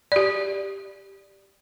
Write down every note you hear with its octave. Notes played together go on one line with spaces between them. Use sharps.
G4 D5